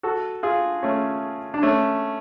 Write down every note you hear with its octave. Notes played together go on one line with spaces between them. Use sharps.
F#4 A4
F4 G#4
A3 C#4
D4
A3 C#4